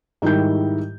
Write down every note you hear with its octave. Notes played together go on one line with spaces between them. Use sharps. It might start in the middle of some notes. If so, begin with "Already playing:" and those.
G#2 D#3 G3 E4 G4 G6